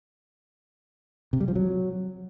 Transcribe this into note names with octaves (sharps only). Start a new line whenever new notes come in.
C3
G3
F3
F#3